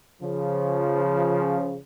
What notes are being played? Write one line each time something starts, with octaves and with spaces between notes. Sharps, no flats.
C#3 F3